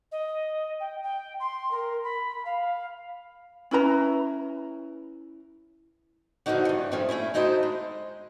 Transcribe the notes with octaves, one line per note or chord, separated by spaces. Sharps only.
D#5
G5
G5
C6
A#4
B5
F5
C#4 E4 B4 A#5
D3 E3 F3 D4 D#4 F#4
G2 E3
F3 G3 A3 C4 C#4
A3 C4 C#4 E4
F#3 A3 D#4 E4 C5 D#5
G#3